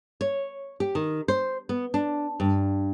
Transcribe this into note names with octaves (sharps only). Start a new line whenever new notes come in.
C#5
G4
D#3
C5
B3
D4
G2